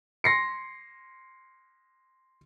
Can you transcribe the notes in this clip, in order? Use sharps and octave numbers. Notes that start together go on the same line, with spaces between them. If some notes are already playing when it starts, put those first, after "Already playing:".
C6 A#6 C7 C#7